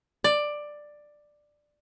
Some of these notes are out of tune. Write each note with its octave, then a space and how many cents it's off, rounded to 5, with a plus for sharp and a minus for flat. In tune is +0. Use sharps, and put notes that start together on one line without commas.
D5 +10